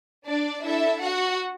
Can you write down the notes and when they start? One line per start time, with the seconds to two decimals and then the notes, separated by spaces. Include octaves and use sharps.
0.25 D4 D5
0.63 D4 E4 A4 E5
1.01 F#4 F#5